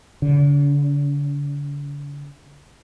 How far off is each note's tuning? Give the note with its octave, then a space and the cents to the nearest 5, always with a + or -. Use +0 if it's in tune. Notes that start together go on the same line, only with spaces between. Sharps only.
D3 -40